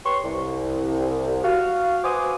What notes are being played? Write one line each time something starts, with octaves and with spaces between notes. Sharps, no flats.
G4 B4 C#5 C6 C#6
C2
F#4 F5
F#4 B4 C5 G#5 D6 D#6